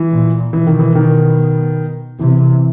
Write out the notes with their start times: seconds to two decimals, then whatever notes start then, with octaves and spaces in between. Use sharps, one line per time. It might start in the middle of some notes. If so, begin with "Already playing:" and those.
Already playing: E3
0.12 A#2
0.53 B2 E3
0.67 D#3
0.79 E3
0.95 D#3
2.19 C3 E3